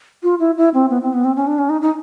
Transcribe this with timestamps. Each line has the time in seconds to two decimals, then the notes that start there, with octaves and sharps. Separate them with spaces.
0.23 F4
0.40 E4
0.57 E4
0.74 C4
0.90 B3
1.03 C4
1.13 B3
1.24 C4
1.36 C#4
1.47 D4
1.59 C#4
1.70 D#4
1.82 D#4